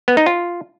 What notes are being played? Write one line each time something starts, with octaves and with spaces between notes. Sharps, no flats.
B3
D#4
F4